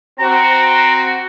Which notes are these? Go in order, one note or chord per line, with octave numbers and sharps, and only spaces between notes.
C4 F#4 A#5